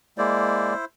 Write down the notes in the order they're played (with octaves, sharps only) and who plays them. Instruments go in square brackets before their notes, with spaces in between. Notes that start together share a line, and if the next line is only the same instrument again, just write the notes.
[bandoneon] G#3 A#3 D5 [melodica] E4 C5